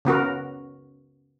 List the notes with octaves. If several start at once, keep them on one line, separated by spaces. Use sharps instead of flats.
C#3 B3 F#4 A#4